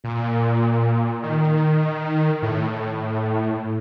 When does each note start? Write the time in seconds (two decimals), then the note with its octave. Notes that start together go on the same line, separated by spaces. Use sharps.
0.04 A#2
1.23 D#3
2.42 A2